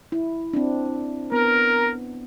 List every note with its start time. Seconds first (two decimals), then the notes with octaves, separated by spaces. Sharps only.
0.12 E4
0.53 C4 D4
1.32 B3 A#4